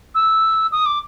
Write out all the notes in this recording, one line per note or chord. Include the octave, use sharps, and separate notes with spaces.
E6
D#6
D6